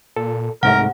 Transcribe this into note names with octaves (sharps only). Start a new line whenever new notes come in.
A#2 A4
C2 G#2 C3 A3 A#4 F#5